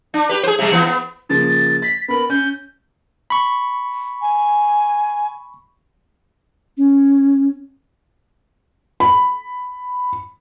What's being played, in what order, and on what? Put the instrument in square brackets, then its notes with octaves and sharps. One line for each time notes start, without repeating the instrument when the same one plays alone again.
[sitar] D4
G4 B4
G#4 C5
C3 G3
E3 B3 C4
B3
[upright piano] C#3 F3 A#3 [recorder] A6
[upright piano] A6 [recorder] B6
[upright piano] B3 A#4 [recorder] B5
[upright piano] C#4 [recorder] G6
[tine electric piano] B5 C#6
[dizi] G#5
[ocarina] C#4
[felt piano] B5